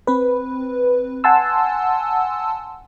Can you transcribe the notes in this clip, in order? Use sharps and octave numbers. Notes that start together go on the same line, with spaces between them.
C4 B4
F#5 G#5 A5 C6 E6